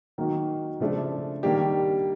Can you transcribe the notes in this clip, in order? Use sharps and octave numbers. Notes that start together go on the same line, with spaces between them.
D#3 F#3 A#3 D#4 F#4
C#3 F3 A3 D4
D#3 G3 A#3 D4 G4